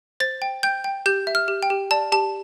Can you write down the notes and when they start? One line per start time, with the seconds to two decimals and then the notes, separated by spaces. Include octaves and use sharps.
0.20 C5 A6
0.42 G5
0.63 G5 G6
0.84 G5
1.06 G4 G6
1.27 E5
1.35 F6
1.48 G4
1.63 G5
1.70 G4
1.91 D5 A5
2.12 G4 A5